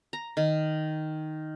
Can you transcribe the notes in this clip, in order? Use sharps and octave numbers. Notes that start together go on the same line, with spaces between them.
A#5
D#3